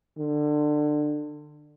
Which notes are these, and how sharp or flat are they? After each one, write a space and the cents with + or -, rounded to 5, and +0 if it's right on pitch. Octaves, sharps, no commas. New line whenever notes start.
D3 +25